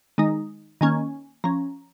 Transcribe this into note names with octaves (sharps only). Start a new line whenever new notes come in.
D#3 G#3 D#4
D#3 A#3 C#4 G#5
F3 C#4 A#5